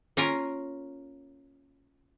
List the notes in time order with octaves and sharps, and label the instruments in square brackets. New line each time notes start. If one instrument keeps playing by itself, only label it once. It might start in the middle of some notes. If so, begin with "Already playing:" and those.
[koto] A#3 C#4 F4 A#4